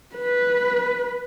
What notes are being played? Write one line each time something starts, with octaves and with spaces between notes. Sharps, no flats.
B4